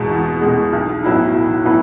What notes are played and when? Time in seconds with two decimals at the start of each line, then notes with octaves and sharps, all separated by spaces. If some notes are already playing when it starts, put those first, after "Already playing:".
Already playing: E2 B2 G#3
0.10 E2
0.41 G#3
0.46 B2
0.73 B1
1.04 A2 F#3 B3 E4
1.34 B1
1.65 A2 F#3 B3 E4